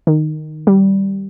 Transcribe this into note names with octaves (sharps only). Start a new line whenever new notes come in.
D#3
G3